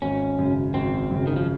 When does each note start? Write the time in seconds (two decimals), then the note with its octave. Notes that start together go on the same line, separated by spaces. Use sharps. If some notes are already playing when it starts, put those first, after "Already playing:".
0.02 G#1 C#4
0.39 F#2 C#3
0.74 G#1 C4
1.11 F#2 C#3
1.27 D#3
1.36 F3